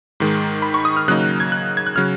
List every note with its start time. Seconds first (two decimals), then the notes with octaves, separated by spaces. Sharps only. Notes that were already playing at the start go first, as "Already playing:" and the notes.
0.20 G#2 D#3 G#3
0.62 B5
0.74 C#6
0.85 D#6
0.97 F6
1.08 C#3 F#3 A#3 D#4 F#6
1.40 G#6
1.52 F#6
1.77 G#6
1.87 F#6
1.96 C#3 F#3 F6